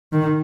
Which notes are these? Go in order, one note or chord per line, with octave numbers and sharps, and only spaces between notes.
D#3